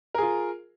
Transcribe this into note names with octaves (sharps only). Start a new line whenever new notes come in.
F4 G#4 A#4